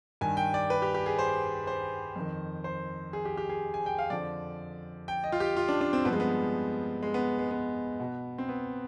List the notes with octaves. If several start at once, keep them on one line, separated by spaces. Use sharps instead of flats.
G2 D#3 G#5
G5
D5
B4
G4
G4
G#4
C5
C5
F2 D#3
C5
G#4
G4
G4
G#4
G#5
G5
F5
F2 D3 F3 D5
G5
D#5
F4
G4
F4
D4
D4
C4
G2 F3 B3
G#3
B3
G#3
B3
G#3
B3
B2
C4
B3